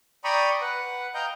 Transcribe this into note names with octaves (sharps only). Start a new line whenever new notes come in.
D5 G5 A#5 B5 C#6 D#6
B4 F#5
D#5 F5 G5 A#5 G6